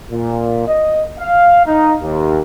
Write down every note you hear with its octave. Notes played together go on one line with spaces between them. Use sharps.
A#2
D#5
F5
D#4
D#2